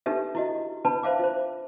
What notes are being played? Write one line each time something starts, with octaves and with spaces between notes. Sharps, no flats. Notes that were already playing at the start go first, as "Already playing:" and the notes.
D4 D#4 G4 A4 B4 E5
E4 F#4 D#5
D4 B4 A5 B5
C5 E5 F5 D6
F4 C5